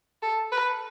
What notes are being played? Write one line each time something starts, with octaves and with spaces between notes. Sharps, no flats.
A4
B4